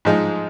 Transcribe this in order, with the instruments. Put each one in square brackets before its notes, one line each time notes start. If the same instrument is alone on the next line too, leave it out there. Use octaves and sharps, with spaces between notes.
[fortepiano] G#2 F3 G#3 D#4